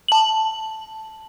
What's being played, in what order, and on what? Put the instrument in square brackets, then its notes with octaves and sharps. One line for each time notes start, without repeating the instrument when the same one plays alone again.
[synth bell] A5 F#7